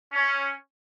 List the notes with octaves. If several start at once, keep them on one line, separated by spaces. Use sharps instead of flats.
C#4